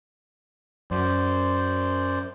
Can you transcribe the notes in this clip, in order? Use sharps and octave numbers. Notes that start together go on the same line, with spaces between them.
F#2 C5 D5